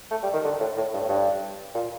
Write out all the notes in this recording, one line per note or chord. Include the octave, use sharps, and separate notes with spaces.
A3
G3
D#3
D3
A2
A2
G2
A2
G2
A#2